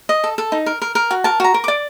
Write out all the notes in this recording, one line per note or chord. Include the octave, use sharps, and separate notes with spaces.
D#5
A4
A4
D#4
A#4
A#4
A#4
F#4
A#4 A5
F#4 A#5
A#4
D5 D6